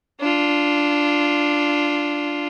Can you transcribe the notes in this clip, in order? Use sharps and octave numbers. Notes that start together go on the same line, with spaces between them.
D4 F4